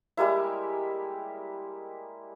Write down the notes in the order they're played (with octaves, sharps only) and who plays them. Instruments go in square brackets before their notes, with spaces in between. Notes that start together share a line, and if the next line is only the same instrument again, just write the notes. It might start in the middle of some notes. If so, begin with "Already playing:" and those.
[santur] G3 G#3 A#3 E4